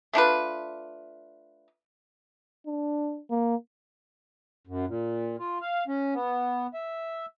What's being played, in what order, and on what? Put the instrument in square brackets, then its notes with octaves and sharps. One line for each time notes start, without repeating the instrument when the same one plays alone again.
[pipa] A3 D4 F4 B4
[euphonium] D4
A#3
[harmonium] F#2
A#2
F4
F5
C#4
B3
E5